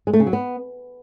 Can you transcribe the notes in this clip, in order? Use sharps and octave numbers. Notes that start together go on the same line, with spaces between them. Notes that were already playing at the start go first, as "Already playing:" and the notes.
G#3
A3
C#3
F#3
B3